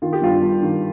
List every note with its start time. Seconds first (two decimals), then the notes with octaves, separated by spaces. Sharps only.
0.02 D#3 F4
0.13 G4
0.22 G2 F4
0.42 G2
0.62 D#3